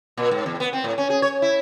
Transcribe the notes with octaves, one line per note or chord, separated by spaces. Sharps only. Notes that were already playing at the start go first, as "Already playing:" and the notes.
A#2
G#2
E2
B3
C4
A2
C#4
G#4
C#5
E4